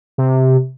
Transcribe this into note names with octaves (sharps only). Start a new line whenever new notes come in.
C3